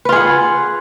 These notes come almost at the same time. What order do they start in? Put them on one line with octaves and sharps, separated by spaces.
B4 F4 G#4 F#5